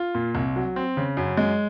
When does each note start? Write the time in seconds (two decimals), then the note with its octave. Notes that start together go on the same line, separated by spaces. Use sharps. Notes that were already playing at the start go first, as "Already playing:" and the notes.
Already playing: F4
0.15 A#2
0.35 C2
0.56 F#3
0.76 C4
0.97 C#3
1.17 F#2
1.37 G#3